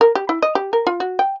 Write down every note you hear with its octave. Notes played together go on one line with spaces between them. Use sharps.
A#4
G4
E4
D#5
G4
A#4
F4
F#4
G5